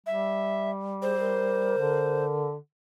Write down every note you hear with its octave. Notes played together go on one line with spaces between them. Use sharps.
G3 E5
G#4 C5
A#4
D3